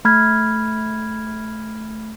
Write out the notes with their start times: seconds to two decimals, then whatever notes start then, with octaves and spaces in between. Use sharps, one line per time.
0.05 A3 B5 F6 G#6